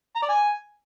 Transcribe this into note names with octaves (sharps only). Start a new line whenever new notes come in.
A#5
D5
G#5